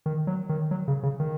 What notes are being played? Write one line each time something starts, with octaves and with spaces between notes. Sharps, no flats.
D#3
F#3
D#3
F#3
C#3
C#3
D#3